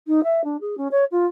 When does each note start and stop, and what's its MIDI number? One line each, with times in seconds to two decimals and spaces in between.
0.07 0.21 63
0.24 0.44 76
0.44 0.57 62
0.61 0.75 68
0.78 0.88 61
0.91 1.04 73
1.11 1.26 65